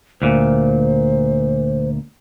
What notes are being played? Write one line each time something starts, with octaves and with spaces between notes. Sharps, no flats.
D2 A#2 C5